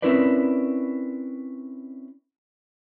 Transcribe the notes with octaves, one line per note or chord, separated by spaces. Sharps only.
C4 C#4 E4 A#4 B4 D5